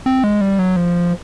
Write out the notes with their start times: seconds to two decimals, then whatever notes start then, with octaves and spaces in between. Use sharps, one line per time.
0.06 C4
0.24 G#3
0.41 G3
0.59 F#3
0.76 F3